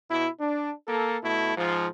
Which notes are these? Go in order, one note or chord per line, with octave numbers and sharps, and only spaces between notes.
B2 E4
D4
A#3 A4
B2 A3 E4
G#2 F3